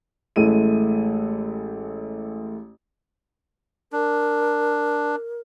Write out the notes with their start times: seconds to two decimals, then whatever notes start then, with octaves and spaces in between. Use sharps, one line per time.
0.36 A1 G#3 A3 E4 D#7
3.93 D4 A#4